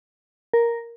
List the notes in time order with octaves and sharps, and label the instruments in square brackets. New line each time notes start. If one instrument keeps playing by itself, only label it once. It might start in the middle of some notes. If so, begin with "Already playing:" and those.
[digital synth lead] A#4